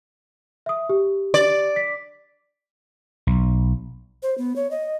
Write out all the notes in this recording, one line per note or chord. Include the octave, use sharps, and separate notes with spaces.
E5 D#6
G4
D5
B6
B1
C5
B3
C#5
D#5